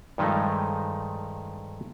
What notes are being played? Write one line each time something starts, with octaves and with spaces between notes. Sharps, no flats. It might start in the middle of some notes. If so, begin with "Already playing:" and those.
G2 D#3 F3 G#3 A3 D#4